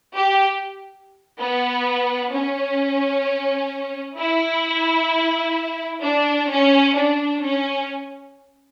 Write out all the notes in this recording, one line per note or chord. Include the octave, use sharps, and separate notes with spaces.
G4
B3
C#4
E4
D4
C#4
D4
C#4